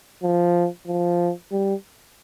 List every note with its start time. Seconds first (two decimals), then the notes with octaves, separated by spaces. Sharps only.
0.23 F3
0.87 F3
1.52 G3